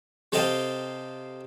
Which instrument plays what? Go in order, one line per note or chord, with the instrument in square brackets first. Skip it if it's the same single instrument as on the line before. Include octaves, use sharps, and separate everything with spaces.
[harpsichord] C3 A4 C5 D#5 F5 G5